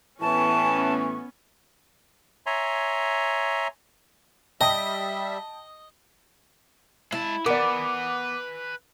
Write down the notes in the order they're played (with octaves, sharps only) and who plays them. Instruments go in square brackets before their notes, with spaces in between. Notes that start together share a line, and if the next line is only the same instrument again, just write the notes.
[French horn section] A2 E3 [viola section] B3 C#4 [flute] A5 [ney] C#6
[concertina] C#5 E5 G#5 A#5 C6
[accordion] G3 E5 [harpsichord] D#5 [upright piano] G5 A5 D#6
[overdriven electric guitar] G#3 A5 [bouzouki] E4
[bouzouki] B3 [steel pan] A#4 D5 [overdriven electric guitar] B4 G#5 [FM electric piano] D6